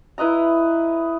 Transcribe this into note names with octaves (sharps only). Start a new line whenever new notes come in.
E4 B4 D#5 A#5